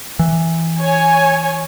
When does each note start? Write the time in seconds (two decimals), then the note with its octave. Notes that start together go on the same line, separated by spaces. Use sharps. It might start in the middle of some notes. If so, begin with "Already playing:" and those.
0.19 E3
0.79 C#5 G#5